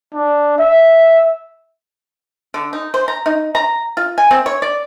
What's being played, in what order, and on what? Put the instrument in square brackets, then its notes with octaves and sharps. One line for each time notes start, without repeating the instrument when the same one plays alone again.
[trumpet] D4
E5
[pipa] D3
D#4
C5
A#5
D#4
A#5
F4
G#5
C4
C#5
D5